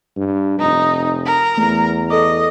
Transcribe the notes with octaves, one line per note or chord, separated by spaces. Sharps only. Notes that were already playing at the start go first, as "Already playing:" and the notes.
G2
F1 D#4
A#4
E2 A3
A4 D#5 D6